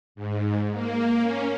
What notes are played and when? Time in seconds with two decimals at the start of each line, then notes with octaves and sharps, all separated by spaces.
0.15 G#2
0.72 A#3
1.20 C#4